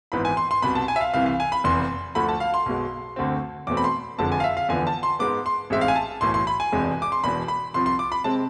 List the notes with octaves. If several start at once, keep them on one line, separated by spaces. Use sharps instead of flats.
G#1 G#2 E3 B3 B5
G#5
C6
C6
C2 B2 B3 B5
A5
G#5
E5
F5
C2 C3 E3 F5
F5
G#5
B5
F1 E2 C3 C6
D2 D3 F3 A3 B5
A5
F5
C6
B1 B2 G#3
D2 D3 A3 C4
E2 B2 A3 C4 D6
B5
C6
F1 F2 D3 F3 G#3 A5
G#5
F5
E5
F5
E2 D3 F3 B3 G#5
A5
C6
G#2 G#3 B3 D6
C6
A1 G#2 G#3 C4 E5
F5
G#5
A5
B1 A2 E3 C6
C6
B5
G#5
E1 E2 C3 G#3
D6
C6
E1 E2 B2 B3 B5
B5
C2 C3 F3 C6
C6
D6
B5
C3 G#3 C4 A5